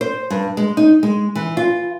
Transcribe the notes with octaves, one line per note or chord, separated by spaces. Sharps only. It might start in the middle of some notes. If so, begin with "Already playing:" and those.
C5
G2
G#3
D#4
G#3
E3
F4